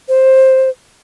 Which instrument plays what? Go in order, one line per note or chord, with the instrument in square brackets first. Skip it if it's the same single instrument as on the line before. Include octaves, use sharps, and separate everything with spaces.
[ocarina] C5